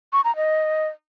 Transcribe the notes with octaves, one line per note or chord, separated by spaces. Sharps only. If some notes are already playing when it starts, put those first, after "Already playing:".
C#6
A#5
D#5